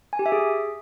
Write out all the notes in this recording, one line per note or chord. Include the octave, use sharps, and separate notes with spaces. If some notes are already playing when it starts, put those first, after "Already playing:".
G#5
G4
E5
G#4